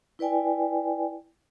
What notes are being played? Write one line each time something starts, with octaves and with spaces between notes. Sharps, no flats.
E4 B4 D5 G5 G#5